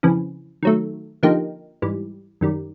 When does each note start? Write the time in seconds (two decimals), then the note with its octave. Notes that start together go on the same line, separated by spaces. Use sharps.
0.03 F2 C#3 E3
0.63 D#3 F#3 A3
1.23 D3 F3 A#3 D#4 G4
1.82 G#2 E3 G3
2.41 F#2 D#3 G3